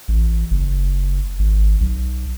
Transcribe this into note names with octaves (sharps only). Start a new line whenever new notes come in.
A1
F#1
G#1
B1